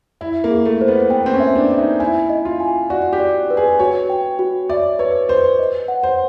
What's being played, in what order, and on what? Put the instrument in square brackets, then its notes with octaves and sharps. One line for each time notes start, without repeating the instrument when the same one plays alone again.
[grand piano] E4 [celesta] E5
[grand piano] A#3
[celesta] G#4
[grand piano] A3
[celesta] C5
[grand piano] B3
[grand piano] B3 [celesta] G5
[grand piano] C4
C#4
[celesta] E5
[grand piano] D4
[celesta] E5
[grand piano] D#4
[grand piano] E4 [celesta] G#5
[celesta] D#5
[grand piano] F4
[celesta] G#5
[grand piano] F#4 [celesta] D5
[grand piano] G4
[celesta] D5
B4
[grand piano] G#4
[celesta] F#4 [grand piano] C#5
[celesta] G5
F#4
[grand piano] D5 [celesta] E5
[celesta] B4 [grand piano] C#5
[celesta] B4 [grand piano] C5
[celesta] D#5
F#5
[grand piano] C5